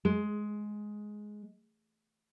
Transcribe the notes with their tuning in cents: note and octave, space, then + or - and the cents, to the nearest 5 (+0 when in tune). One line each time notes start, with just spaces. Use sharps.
G#3 +10